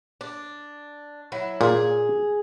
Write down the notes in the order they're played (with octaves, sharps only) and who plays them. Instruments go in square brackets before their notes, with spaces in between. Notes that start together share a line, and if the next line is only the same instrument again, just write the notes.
[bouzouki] D4
F#3 E4
[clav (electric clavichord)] A#2 [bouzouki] G#4